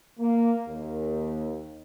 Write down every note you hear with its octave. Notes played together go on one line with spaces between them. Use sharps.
A#3
D#2